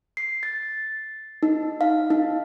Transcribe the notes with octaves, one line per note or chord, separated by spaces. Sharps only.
C7
A6
D#4
F5
D#4